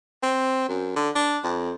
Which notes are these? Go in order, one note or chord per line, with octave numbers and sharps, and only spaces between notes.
C4
F#2
D3
D4
F2